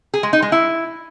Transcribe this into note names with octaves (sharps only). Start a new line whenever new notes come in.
G#4
G#3
D#4
G#3
E4